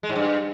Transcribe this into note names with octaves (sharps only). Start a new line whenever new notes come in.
G#3
G#2
G2